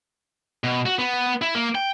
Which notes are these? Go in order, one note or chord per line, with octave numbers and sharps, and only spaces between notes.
B2
F#4
B3
E4
A#3
G5